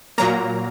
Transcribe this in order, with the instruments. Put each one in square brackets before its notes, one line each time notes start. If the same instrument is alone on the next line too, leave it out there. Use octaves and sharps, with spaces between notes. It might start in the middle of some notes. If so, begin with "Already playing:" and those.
[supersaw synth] A#2 F#3 A#3 A#5